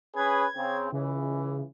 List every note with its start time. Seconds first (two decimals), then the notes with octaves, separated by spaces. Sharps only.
0.16 C#4 G#4 B4 G#6
0.56 C#3 C4
0.92 C#2 C#3 E3